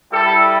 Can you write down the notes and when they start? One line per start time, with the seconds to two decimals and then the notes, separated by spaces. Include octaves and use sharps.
0.12 G3 E4 G4 A4